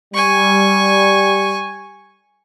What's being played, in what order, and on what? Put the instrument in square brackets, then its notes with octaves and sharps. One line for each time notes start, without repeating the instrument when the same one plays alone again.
[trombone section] G3 [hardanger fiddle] G#5 C#6